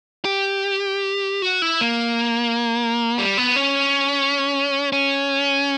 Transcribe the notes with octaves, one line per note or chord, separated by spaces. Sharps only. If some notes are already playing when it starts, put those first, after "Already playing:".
G4
F#4
E4
A#3
G3
B3
C#4
C#4